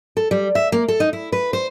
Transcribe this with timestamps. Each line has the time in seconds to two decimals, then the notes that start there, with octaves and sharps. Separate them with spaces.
0.17 A4
0.31 G3
0.55 E5
0.72 A#3
0.88 A4
1.00 D#4
1.13 E4
1.32 B4
1.53 C5